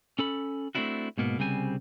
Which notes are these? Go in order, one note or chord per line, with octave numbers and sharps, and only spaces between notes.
C#4 A4 B5
A3 A#3 C4 D4 E4 F#4
G#2 B2 A#3 B3
C2 C#3 G3 C4 G#5